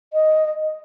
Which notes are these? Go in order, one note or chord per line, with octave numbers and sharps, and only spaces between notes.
D#5